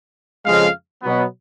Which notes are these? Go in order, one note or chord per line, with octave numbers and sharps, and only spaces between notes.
F2 C#3 G#3 F5
B2 F#3 B3